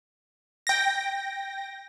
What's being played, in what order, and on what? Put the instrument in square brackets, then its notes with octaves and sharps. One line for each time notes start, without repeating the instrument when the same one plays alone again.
[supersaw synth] G5 A#6